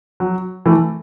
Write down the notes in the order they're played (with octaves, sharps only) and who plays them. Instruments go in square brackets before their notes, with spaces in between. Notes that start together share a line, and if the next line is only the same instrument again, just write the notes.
[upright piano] F#3
E3 A3